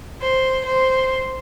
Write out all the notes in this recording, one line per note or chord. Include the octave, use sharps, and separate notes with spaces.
C5
C5